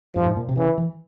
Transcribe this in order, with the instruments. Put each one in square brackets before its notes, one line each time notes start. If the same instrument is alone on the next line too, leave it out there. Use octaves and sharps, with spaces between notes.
[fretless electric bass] G2 [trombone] F3
[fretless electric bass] G#2
A#2
C3
[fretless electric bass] C#3 [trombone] E3
[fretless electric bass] E3